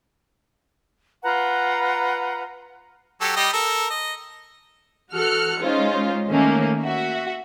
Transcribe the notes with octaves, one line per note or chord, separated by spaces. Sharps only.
F4 B4 F#5 A#5
F#3 G4 A4
G3 G4 D#5
A4 A#4
D#5
E3 F#4 A4 F6 F#6 C#7
G#3 C#4 D#4 F4 C5
D#3 A3 A#3 C#4
F#4 E5